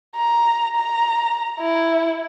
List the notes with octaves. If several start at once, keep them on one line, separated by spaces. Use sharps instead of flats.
A#5
A#5
E4